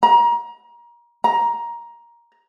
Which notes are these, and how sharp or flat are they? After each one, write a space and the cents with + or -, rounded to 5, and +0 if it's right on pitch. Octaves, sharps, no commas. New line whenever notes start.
A#5 +30
A#5 +15